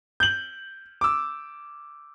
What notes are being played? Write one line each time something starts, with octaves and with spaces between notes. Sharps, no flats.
G6 F#7
D6 E6